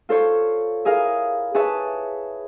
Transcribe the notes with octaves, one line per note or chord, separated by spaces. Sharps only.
F4 A4 C5 C#5
E4 G#4 A#4 F5
G#4 B4 C#5 E5 A5